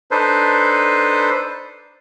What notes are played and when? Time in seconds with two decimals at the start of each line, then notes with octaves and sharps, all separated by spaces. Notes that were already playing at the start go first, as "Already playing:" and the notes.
0.11 D4 D#4 A4 B4 C5